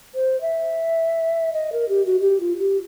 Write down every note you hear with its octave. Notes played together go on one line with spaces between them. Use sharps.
C5
E5
D#5
A#4
G4
F#4
G4
F4
G4